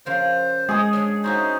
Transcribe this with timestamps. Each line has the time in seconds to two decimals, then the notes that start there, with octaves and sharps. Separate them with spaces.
0.06 C#3 F3 A#3 C5
0.69 G#3 G#4 D#6
0.93 C#4 D4 G5
1.24 C#4 D#4 E4 F#4 C5 D#5